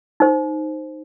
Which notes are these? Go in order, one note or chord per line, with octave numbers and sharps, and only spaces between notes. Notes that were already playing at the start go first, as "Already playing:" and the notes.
D#4 C5